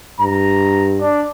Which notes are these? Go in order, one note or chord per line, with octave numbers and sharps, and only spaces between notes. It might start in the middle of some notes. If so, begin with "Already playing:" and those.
G2 A#5
D4